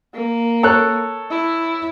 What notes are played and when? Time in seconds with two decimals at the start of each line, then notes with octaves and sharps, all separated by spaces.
0.14 A#3
0.63 A4 C#5 F#6
1.30 E4